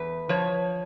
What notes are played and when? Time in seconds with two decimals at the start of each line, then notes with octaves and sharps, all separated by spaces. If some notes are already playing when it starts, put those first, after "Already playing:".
Already playing: E2 B4
0.29 F3 C#5